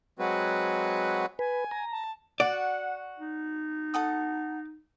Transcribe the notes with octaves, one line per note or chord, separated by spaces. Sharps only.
F#3 G#3 C4 F#4 B4
B4 G#5
A#5
A5
F#4 D5 F#5
D#4
A4 F#5 D#6